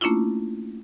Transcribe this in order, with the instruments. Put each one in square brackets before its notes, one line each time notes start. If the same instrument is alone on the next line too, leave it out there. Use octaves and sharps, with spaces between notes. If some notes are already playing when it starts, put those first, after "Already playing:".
[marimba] A3 A#3 C#4 D4 E4 F4